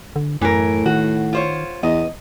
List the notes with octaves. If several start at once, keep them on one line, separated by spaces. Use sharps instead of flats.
D3
F#2 A2 E3 A#4
D#3 F#4
F4 C5 C#5
E2 B3 D#5